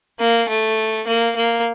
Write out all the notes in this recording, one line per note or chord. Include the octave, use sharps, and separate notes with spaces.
A#3
A3
A#3
A#3